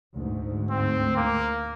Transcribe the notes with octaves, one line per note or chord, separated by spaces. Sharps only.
D2 G#2
C4
A#3